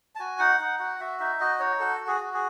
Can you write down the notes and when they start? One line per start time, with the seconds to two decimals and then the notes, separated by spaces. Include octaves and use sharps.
0.15 A5
0.19 F#4 G#5
0.39 D#4 F#5
0.60 D#4 F#5
0.79 F#4 F#5
1.00 F#4 E5
1.20 D#4 E5
1.40 F#4 D#5
1.59 D#4 C#5
1.80 F#4 A4
2.00 F#4
2.07 G#4
2.20 F#4
2.34 G#4